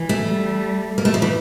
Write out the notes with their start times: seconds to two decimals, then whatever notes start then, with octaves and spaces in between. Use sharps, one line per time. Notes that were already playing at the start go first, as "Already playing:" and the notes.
Already playing: E3
0.09 A3
0.26 G3
0.98 A#3
1.05 A3
1.14 F3
1.22 E3